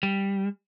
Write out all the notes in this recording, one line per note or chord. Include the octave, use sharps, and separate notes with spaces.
G3